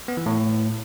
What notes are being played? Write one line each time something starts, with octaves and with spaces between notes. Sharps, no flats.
B3
E3
A2